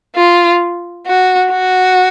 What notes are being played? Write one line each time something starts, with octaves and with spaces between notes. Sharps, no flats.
F4
F#4
F#4